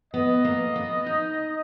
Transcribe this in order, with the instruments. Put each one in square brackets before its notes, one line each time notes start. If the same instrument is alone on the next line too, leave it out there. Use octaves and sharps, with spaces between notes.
[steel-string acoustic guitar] B3 [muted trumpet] D#5
[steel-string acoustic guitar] A#3
B3
D#4